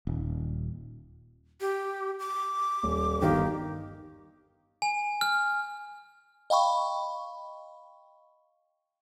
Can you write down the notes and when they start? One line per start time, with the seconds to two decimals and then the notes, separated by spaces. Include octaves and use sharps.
0.07 D#1
1.61 G4
2.19 D6
2.83 D#1
3.21 G1 D#3 G4 F5
4.82 G#5
5.21 F6
6.50 D#5 F5 G5 B5 C#6